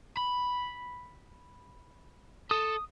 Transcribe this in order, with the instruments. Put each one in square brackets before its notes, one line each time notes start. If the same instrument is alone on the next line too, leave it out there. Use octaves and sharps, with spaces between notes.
[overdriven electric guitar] B5
[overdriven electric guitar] A4 [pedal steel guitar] D#6